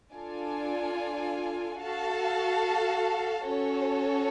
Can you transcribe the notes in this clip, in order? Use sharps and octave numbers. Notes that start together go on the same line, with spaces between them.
D4 F4 A4 D5 G#5
F#4 A4 F5 A5
C#4 F#4 A4 C#5